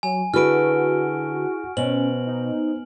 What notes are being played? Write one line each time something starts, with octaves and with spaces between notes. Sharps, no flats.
F#3 G#5
D3 E4 F#4 G#4 B4 F6 D7
B2 C#4 C5 F#7
D#4